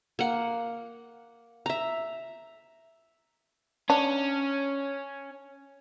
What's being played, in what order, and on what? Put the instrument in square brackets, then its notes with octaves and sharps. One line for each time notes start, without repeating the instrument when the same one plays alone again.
[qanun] A#3 F#5
E5 A#5
[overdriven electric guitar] C#4 [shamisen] D4